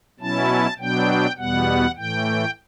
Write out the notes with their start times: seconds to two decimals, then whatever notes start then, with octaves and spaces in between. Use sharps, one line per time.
0.19 B2 F#3 C#4 E4 A5
0.79 B2 F#3 B3 D4 G5
1.38 E2 B2 G3 B3 F#5
1.97 A2 E3 A3 G5